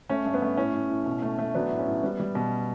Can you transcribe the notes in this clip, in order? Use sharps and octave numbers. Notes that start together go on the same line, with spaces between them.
A3 C#4
G2
B3
A3
A2 C#4
A2
A2
B2
A3
A3
F#3 B3 D4
A2
C#4
A2
G3 B3
G3
B2